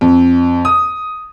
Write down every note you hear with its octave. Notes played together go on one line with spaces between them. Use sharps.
F2
D#6